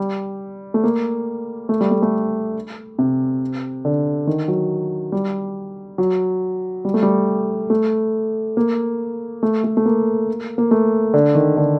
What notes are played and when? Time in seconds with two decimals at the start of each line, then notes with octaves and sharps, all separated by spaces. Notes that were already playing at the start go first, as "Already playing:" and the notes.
Already playing: G3
0.74 A3
0.84 A#3
1.69 A3
1.81 G3
1.91 A3
2.02 A3
2.99 C3
3.85 D3
4.27 D#3
4.48 F#3
5.12 G3
5.98 F#3
6.85 G3
6.94 A3
7.03 G3
7.70 A3
8.57 A#3
9.43 A3
9.64 A3
9.77 A3
9.85 A#3
10.58 A#3
10.71 A3
11.14 D3
11.35 D#3
11.57 D3